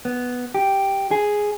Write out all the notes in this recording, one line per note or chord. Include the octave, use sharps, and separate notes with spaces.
B3
G4
G#4